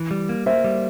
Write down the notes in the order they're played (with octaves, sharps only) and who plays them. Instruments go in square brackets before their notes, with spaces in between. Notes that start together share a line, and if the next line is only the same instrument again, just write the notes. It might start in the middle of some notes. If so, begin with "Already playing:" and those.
Already playing: [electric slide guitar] E3
G3
A#3
[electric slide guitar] A#3 [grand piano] C5 E5
[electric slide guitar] G3